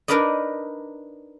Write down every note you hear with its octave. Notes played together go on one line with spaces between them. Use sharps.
D4 D#4 A#4 B4 D5 D#5